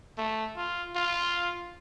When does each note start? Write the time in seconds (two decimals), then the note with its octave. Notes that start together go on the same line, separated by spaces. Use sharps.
0.18 A3
0.57 F4
0.95 F4